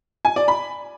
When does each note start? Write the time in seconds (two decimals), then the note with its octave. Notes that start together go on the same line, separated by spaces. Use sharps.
0.25 G#5
0.36 D5
0.48 B5